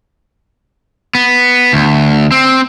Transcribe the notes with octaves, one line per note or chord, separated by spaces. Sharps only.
B3
D2
C4